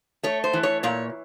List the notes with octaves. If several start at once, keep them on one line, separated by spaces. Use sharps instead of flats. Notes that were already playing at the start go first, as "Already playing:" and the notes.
A3 C#5
C5
E3
C#5
A#2 C#5